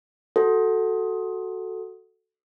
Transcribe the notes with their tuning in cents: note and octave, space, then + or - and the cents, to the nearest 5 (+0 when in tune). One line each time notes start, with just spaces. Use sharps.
F#4 +5 A4 +0